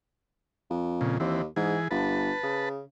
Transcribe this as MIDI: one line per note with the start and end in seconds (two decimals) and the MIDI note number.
0.70 1.18 41
1.01 1.18 46
1.01 1.18 49
1.20 1.45 39
1.20 1.42 52
1.20 1.42 60
1.56 1.77 44
1.56 1.88 52
1.56 1.88 68
1.91 2.32 31
1.91 2.69 71
1.91 2.69 81
2.43 2.81 49